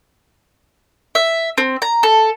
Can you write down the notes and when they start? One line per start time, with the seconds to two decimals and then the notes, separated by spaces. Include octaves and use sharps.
1.15 E5
1.58 C4
1.82 A#5
2.03 A4